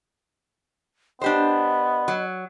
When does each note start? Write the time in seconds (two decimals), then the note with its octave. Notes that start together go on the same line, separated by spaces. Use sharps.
1.21 B3 D4 G4 C5 D#5
2.08 F#3